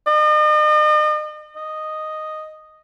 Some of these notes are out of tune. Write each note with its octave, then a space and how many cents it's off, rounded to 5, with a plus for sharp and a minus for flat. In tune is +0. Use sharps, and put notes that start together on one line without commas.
D#5 -40
D#5 -5